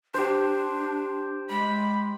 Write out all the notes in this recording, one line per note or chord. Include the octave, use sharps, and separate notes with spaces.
D4 G4 C5
G#3 B5